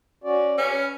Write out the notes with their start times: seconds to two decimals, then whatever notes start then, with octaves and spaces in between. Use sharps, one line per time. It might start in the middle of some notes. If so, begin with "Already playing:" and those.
0.24 C#4 F#4 D5
0.58 C#4 B4